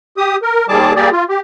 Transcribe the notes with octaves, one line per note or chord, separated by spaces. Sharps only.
G4 D#6
A#4
D#2 D#3 G3 G#4 A5 D6
G3 A#3 G4 G#4 D5
F4
G4